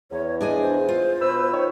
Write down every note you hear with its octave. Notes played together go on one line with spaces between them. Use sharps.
E2 C#5
D4 G#4 D#5 G#5
C5
F4
B2 B4 E6
D#3 C#5